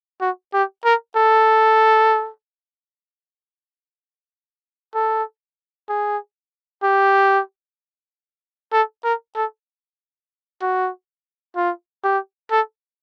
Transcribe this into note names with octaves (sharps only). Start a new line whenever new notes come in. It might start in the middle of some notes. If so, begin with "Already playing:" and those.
F#4
G4
A#4
A4
A4
G#4
G4
A4
A#4
A4
F#4
F4
G4
A4